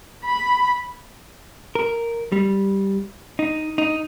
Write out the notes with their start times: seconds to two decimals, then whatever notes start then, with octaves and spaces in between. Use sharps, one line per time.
0.25 B5
1.75 A#4
2.32 G3
3.39 D#4
3.78 D#4